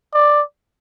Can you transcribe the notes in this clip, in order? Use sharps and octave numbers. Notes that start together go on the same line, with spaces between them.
D5